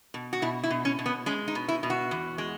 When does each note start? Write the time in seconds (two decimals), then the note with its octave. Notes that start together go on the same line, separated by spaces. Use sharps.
0.14 B2
0.33 F#4
0.42 B2 E4
0.63 E4
0.70 B2
0.85 C#4
0.99 B2
1.06 B3
1.26 G#3 C#4
1.48 D#4
1.55 B2
1.68 E4
1.83 B2
1.90 F#4
2.11 E2
2.38 G#3